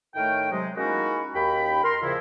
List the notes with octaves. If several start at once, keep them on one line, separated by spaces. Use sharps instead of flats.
A2 D#3 A3 A#4 C#5 G5
C3 F#3 G#3
G#3 A#3 C#4 D#4 E4 F#4
D#2 G5 B5
A#4 C6
A#2 C#3 F3 E4